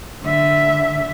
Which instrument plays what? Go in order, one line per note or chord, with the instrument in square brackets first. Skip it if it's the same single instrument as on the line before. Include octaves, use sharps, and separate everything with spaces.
[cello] D3 E5